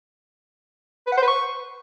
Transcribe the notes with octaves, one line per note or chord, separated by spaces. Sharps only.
B4
F#5
C5
B4
C#6